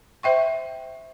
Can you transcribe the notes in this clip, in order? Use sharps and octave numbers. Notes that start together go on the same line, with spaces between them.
C5 E5 G5 C#6